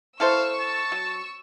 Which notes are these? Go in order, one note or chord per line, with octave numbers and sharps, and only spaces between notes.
E4 A4 C5 F5 C#6 E6
A5
F#3